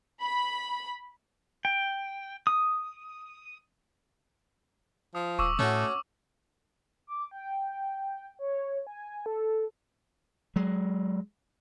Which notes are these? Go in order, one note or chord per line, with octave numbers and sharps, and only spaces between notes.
B5
G5
D#6
F3 D#6
D#1 C#6 D6 E6
A2 A3 C#4 F#4
D6
G5
C#5
G#5
A4
F#3 G#3